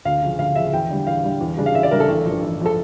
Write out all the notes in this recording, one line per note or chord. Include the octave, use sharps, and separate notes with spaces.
D2 F5
C#3 F3
D2 F5
C#3 F3 E5
E2 G5
D3 G3
E2 F5
D3 G3
E2
C#3 G3 D4
F5
E2 E5
D5
C#3 G3 D4 A#4
A4
A1
G2 F3
A1
F3 A4